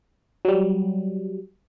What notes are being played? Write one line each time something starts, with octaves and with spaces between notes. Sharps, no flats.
F#3 G3